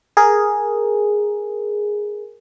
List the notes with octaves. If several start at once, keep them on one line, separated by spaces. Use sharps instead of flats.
G#4 A#4